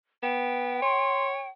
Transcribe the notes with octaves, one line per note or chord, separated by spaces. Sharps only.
B3 G5
C#5 C6